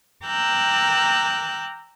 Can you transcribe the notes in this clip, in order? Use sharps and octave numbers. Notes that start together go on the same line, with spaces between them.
G5 A#5 D6 E6 F#6 G6